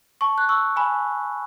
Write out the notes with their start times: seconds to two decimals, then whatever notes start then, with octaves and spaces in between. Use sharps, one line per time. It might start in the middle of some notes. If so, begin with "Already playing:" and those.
0.21 A5 C#6
0.38 F#6
0.49 C#6 E6
0.76 G#5 B5